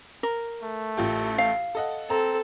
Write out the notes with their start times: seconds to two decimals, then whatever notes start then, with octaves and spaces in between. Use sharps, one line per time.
0.23 A#4
0.63 A3
0.97 A1 F4 G4
1.38 F5
1.75 A4 D#5 F#5
2.10 C4 A4 A#5